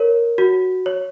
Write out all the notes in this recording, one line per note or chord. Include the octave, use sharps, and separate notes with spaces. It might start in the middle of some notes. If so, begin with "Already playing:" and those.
Already playing: A#4 C#5
F#4
C#5